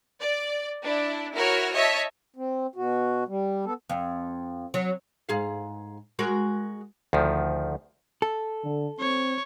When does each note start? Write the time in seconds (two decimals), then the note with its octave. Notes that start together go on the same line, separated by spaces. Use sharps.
0.20 D5
0.82 D4 E4
1.34 E4 F#4 A#4 C#5 F6
1.73 C#5 D#5 E5 A5
2.36 C4
2.76 B2 F#4
3.28 G3
3.65 B3 A4
3.89 F2
4.74 F#3
5.29 G#2 G#4 F5
6.19 G#3 F#4 A#4
7.13 D2 D#3 F3
8.22 A4
8.64 D3
9.00 C4 C#5